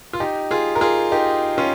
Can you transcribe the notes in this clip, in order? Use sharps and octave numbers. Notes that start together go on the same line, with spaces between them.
F4
D#4 G4
F4 G#4
A#4
F4 G#4
D#4 G4
C#4 F4